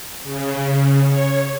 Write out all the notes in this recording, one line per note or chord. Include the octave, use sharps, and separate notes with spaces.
C#3
C#5